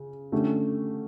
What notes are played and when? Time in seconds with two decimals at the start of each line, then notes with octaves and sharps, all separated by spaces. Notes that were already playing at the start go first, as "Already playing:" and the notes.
Already playing: C#3
0.32 D3 A3 C#4 G4